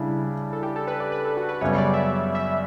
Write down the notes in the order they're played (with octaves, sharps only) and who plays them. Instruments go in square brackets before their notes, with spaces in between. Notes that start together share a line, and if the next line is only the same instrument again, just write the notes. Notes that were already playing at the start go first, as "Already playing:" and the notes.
Already playing: [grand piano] C#3 G3 D4 [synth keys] E4
[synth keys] A4
G4
A4
B4
D5
B4
A4
F#4
B4
[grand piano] F#2 C#3 G3 B3 [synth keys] C#5
[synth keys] D5
E5
E5